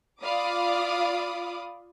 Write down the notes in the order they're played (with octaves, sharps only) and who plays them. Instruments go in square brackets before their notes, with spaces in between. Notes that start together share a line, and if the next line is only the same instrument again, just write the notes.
[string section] F4 D5 F5 B5 D6 D#6